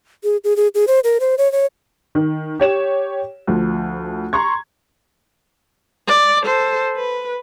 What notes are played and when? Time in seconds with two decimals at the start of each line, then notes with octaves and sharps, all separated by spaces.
0.24 G#4
0.44 G#4
0.56 G#4
0.75 G#4
0.88 C5
1.04 A#4
1.20 C5
1.38 C#5
1.52 C#5
2.15 D#3
2.60 G4 C#5 E7
3.47 D2 F3
4.33 A#5 C6 C#6 G#6
6.08 D5
6.43 A4 C5
6.96 B4